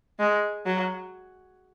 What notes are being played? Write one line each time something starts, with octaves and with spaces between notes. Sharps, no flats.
G#3
F#3